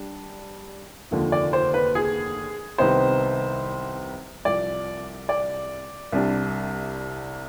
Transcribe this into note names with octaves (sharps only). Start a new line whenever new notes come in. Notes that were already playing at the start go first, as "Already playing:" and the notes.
Already playing: G3 D4
F1 D#2 D3 F3
D5
C5
B4
G#4
C2 C3 D#3 B3 D#4 C5
C2 C3 F3 D5
D5
C2 C3 G3 D4